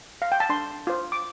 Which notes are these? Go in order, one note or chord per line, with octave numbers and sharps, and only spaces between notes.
F5
G5
A5
D4 C6
F4 C5
D6